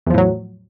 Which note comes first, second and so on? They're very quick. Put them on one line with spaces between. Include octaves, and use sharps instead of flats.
E2 F3 A2 F#3